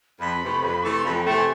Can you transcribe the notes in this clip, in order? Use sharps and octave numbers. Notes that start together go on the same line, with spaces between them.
F2 B5
C3 E3 A3
F2
C3 E3 A3 D6
C#6
C6
F2 B5
G5
C3 E3 A3 G5
G#5